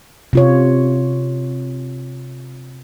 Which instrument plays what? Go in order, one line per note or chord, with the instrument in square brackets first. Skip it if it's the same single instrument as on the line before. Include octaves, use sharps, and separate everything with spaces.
[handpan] C3 F4 C#5